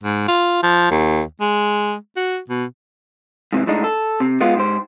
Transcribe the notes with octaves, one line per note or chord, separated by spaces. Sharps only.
G#2
F4
F3
D#2
G#3
F#4
B2
G#2 C3 E3
A2 G#3 D4 D#4
A4
C3
G#3 B3 F4
G#2 G4 C5